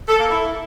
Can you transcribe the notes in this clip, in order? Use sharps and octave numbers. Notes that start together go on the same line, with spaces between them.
A4
A#3
E4